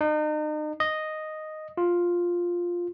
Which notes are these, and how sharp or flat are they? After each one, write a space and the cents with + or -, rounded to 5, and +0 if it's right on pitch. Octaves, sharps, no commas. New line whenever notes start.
D#4 -40
D#5 -5
F4 +5